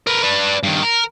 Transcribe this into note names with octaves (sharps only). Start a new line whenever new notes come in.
A#4 B4
D4 B4
G2 D#3
A#4